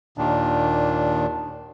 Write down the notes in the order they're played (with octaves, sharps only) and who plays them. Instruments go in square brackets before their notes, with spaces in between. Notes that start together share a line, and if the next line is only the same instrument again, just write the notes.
[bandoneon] D#2 A#2 D#3 D4